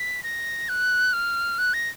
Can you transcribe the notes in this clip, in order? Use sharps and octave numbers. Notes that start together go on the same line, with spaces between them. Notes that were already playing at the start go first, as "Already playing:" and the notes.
Already playing: B6
A#6
F#6
F6
F#6
A#6